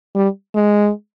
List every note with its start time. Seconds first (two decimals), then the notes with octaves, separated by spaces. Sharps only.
0.15 G3
0.55 G#3